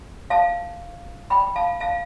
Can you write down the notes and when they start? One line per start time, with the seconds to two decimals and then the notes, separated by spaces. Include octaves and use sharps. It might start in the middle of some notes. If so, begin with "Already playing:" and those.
0.30 F5 A5
1.30 G5 B5
1.56 F5 A5
1.80 F5 A5